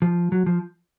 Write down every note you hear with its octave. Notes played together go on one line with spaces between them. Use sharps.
F3
F#3
F3